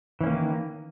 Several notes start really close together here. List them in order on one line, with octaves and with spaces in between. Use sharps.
E3 C#4 A#3 D#3